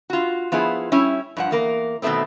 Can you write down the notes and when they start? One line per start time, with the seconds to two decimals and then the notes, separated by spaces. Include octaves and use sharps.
0.10 F4 F#4
0.52 F3 B3 E4 F4 G#4
0.92 G3 C#4 E4
1.37 G2 F3 F#5
1.51 E2 A#3 A#4
2.02 B2 D#3 G3 A3 B3 C4